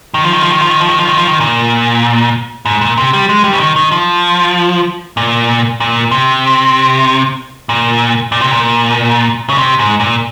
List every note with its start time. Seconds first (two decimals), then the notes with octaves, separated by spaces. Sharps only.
0.14 D#3
0.24 F3
0.33 D#3
0.42 F3
0.51 D#3
0.61 F3
0.70 D#3
0.80 F3
0.89 D#3
0.99 F3
1.08 D#3
1.17 F3
1.27 D#3
1.40 A#2
2.65 G#2
2.81 A#2
2.98 C3
3.14 G3
3.29 G#3
3.44 G3
3.53 C#3
3.60 D#3
3.76 D#3
3.92 F3
5.17 A#2
5.80 A#2
6.11 C3
7.69 A#2
8.32 A#2
8.41 C3
8.51 A#2
9.49 C#3
9.58 C3
9.79 G#2
10.00 A#2